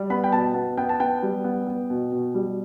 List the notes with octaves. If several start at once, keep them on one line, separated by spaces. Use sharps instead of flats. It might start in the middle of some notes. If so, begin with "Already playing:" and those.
Already playing: G3
B3 B5
G5
B2 A5
B3
B3 G5
A5
B3 G5
G3
B3
B3
B2
B2
G3